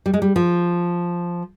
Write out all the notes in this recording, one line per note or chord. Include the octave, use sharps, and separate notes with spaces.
G3
G#3
G3
F3